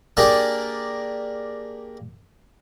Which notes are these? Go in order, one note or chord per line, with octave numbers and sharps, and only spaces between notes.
A#3 D4 G4 G#4 A#4 A5